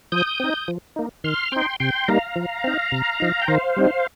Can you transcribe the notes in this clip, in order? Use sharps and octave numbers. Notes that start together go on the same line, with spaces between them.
F3 D#6 G6
C4 D#4
F3
A#3 D#4
D#3 C6 F6
C4 D#4 G5 C6
C3 G5 C6
G3 A#3 D#4 F5 A#5
F3
C4 D#4
C3
F3 D#4
G5
D#3 C5 F5
G3 C4 D#4